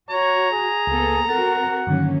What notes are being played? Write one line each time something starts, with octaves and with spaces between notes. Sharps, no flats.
F#4 C#5 A#5
G#4
C#2 A#3 B3 A4
C4 F#4 A4 A#4 F#5 A6
G2 D3 D#3 F#3 A#3 C#4